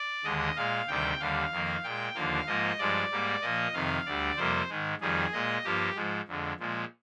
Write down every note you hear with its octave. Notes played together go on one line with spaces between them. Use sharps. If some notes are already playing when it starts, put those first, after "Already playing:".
Already playing: D5
D#2 D3 G#3 D#5
A#2 G#3 F5
D2 C3 D#3 G3 G5
D#2 D3 G3 F5
F2 D#3 A#3
A#2 G#3 G5
D#2 D3 F3 A#3 F5
G#2 F3 A#3 D#5
G2 F3 G#3 D5
G#2 G3 A#3
A#2 F3 A#3 D#5
F2 C3 D#3 F5
D2 D3 G3 D5
F2 C3 G3 A#3 C5
G#2 D#3 G#3
F2 D#3 G3 G#4
A#2 G#3 D#5
G2 F3 A#3 G4
G#2 F3 G#3
F2 D3 G#3
A#2 F3 G#3